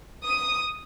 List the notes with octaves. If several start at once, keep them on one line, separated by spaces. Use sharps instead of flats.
D#6